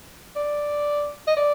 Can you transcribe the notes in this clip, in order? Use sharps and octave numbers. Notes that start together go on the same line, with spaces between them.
D5
D#5
D5